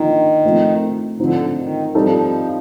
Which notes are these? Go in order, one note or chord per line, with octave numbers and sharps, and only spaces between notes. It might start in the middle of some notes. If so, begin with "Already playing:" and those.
Already playing: D3 D#3 F3 A#3
F3 A3 C4
D3 F3 C4 D#4
D#3
F3 G3 C4 D#4 A4